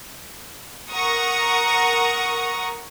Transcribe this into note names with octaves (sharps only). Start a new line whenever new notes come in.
A#4 F#5 A#5 C#6 D#6